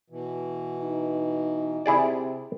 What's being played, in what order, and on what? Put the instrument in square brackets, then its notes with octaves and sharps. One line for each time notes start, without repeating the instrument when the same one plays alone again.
[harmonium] B2 E3
[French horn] D#4
[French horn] C3 [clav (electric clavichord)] E4 G#4 D5